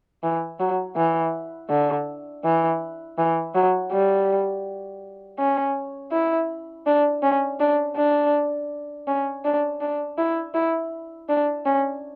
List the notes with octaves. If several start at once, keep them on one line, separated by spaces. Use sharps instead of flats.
E3
F#3
E3
D3
E3
E3
F#3
G3
C#4
E4
D4
C#4
D4
D4
C#4
D4
D4
E4
E4
D4
C#4